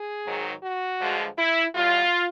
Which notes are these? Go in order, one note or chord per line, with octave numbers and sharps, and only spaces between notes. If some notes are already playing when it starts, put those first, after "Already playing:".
Already playing: G#4
G#2 D#3 F#3
F#4
G2 D3 F3 G#3
E4
E2 B2 G3 F4